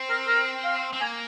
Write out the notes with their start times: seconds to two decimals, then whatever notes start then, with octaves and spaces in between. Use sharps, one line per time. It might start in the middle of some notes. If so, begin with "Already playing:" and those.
Already playing: C4
0.10 A#4
0.27 A#4
0.64 F5
0.93 C4
1.01 A#3 G#5